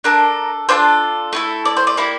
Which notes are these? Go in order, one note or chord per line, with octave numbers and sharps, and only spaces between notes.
D4 A4 A#4
D4 F4 A4 C5
A3 E4 A4
D5
C5
D5
A#3 E4 G4